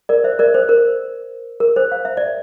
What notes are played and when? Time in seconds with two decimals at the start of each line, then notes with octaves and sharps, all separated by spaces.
0.09 A#4 D5
0.24 C5 E5
0.39 A#4 D5
0.54 C5
0.69 A#4
1.60 A#4
1.76 C5
1.92 F5
2.05 E5
2.17 D5